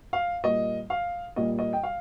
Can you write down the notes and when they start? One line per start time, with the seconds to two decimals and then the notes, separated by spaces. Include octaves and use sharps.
0.13 F5
0.44 A#2 G3 A#3 D#5
0.90 F5
1.36 A#2 G3 A#3 D#5
1.59 D#5
1.73 G5
1.83 F5